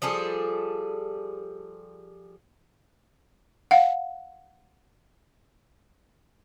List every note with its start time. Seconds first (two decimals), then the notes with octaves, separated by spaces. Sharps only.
0.02 F3 G3 G#4 A4
3.71 F5 F#5